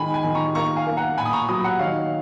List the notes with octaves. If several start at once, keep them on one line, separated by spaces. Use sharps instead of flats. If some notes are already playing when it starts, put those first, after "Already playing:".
Already playing: D#3 G#3 G#5 B5
G#5 B5
D#3
A#5 C#6
A#3 A#5 C#6
F5 G#5
A#3
F#5 A#5
A#2 G#5 B5
D#6
A#5 C#6
F#3 B5 D#6
F#5 A#5
D#3 C#5 F5